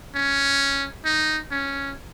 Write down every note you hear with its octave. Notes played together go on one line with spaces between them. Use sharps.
C#4
D#4
C#4